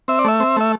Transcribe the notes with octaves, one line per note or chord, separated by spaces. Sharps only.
C4 E5
D5
A3 E5
C4
A3 E5